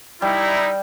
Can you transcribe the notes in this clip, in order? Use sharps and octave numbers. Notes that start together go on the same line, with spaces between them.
G3 D#4 E4